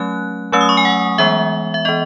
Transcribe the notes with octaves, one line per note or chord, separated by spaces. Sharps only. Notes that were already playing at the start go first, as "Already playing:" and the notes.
Already playing: F#3 A3 C#4 F#6
F#3 A3 C#4 E6
D#6
C#6
G#5
F#5
E3 G#3 B3 E5
E5
E3 B3 D#5